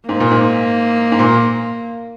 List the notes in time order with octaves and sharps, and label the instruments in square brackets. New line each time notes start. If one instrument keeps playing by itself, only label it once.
[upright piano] G#2 [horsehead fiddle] A#3
[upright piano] A#2
G#2
G#2
A#2